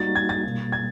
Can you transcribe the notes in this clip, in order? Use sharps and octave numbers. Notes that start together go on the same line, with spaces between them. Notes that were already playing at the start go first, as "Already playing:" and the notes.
Already playing: G3 A#3 D#4 F#4 A6
G#6
A6
B2 G3 A#3
G#6